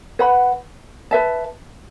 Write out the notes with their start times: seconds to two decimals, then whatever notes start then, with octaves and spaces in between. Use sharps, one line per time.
0.19 B4 F#5 B5
1.11 B4 E5 A5